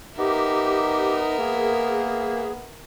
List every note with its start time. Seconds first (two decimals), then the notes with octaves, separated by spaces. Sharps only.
0.18 B3 D#4 G4 A#4 E5
1.39 A#3 G#4